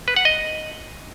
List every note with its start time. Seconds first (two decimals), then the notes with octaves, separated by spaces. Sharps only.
0.08 B4
0.16 F#5
0.25 D#5